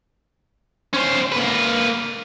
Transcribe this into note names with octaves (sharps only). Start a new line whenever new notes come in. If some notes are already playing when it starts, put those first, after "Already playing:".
C#4 C5
A#3 B4